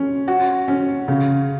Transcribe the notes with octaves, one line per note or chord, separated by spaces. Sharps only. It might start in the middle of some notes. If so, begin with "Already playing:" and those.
Already playing: C#4
F#4
C#4
C#3